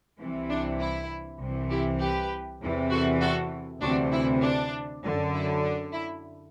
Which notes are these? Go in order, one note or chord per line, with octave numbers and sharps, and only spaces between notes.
C2 C3 E3
D4
E4
C2 C3 E3
E4 G4
G4 B4
E2 C3 E3
F#4 A4
F#4 A4
D2 C3 E3 D4 F#4
E4
D4
F#2 D3
E4
D4
E4